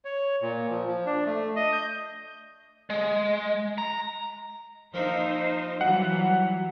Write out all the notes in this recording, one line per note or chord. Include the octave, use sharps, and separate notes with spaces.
C#5
A#2
F3
F3
D4
A3
D#5
G6
G#3
A#5
F3 A#3 D#4 E4 C5
E3 F#3 G3 F#5